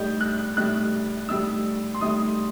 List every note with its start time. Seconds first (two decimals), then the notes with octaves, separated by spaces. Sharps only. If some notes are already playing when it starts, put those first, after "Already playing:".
Already playing: A2 G3 D#4 G6
0.21 F#6
0.57 A2 G3 D#4 F#6
1.29 A2 G3 D#4 E6
1.95 C6
2.01 A2 G3 D#4 D#6